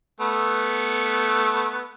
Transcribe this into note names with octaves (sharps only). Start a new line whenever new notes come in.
A3 B3